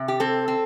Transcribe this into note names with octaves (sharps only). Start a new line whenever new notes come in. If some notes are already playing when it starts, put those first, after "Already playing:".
Already playing: C3
G4
C4 A4
C4